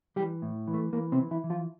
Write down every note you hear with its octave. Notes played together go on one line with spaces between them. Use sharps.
E3 G3 G4
A2
E3
A3
E3 A#3
C3 C4
E3
E3 E4
E3
F3 F4